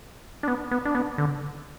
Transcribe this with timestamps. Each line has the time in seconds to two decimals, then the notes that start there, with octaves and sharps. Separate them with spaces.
0.43 D4
0.48 B3
0.71 B3
0.85 D4
0.95 B3
1.18 D3